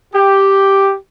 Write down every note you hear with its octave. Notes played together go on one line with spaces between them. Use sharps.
G4